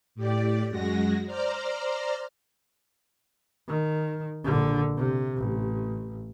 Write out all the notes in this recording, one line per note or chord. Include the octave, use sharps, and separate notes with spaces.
A2 G4 D5
F#2 G#3 F#4 A#6
C5 D5 A#5 F6
D#3
A#1 D3
C3
A1